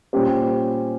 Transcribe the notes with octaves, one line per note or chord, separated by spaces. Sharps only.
A#2 G3 C#4 G4 C5